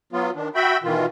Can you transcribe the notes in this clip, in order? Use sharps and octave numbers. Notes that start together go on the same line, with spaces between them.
F#3 B3 F4
D#3 D4
F#4 E5 G5 B5
B2 D#3 E3 F4